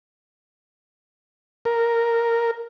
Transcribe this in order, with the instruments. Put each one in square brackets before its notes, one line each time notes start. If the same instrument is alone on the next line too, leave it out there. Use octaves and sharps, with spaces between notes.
[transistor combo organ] A#4